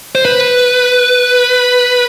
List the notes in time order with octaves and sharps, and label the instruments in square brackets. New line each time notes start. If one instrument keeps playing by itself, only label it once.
[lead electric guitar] C5
B4